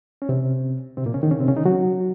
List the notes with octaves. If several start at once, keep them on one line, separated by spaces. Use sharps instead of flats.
C#4
C3 C4
C3 C4
A#2 A#3
C#3 C#4
D#3 D#4
C#3 C#4
C3 C4
C#3 C#4
D#3 D#4
F#3 F#4